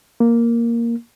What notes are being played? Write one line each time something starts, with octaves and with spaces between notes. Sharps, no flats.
A#3